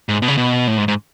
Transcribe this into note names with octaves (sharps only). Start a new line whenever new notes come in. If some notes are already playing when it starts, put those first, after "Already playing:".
G#2
B2
C#3
B2
A2
G#2
G#2